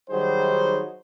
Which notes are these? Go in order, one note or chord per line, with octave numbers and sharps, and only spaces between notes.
D#3 F#3 G3 D#4 G#4 C5